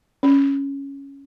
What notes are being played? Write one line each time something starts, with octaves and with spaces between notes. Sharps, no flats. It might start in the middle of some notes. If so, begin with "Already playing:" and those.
C#4